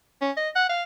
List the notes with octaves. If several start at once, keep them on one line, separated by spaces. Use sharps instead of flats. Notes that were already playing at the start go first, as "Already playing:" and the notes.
C#4
D#5
F#5
F5